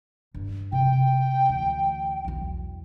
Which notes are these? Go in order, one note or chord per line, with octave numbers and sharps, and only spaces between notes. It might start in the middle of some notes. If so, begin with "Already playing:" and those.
G2 D4
C3 G5
D2 E3
B1 E2